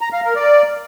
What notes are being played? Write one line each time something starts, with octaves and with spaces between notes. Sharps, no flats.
A#5
F5
A#4
D5